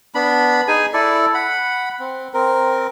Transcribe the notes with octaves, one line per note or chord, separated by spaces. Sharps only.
B3 D4 B5
D#4 G#4 G#5
E4 A4 D5
F#5 B5
C4
C4 A#4